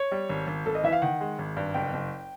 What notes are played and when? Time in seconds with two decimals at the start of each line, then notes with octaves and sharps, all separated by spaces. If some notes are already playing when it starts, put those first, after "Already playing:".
Already playing: C#5
0.12 G3
0.29 G#1
0.47 G#1
0.66 G#1 A4
0.75 D#5
0.84 E3 E5
0.92 F5
1.02 D#3 F#5
1.21 G#3
1.39 G#1
1.57 G2
1.74 F#1 G5
1.93 F#1